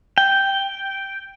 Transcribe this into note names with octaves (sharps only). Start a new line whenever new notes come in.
G5